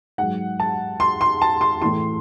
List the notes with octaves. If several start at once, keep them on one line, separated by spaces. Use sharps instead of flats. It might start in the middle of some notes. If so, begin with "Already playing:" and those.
G#2 F#3 F#5
A5
C6
C6
A5
C6
A2 E3 C6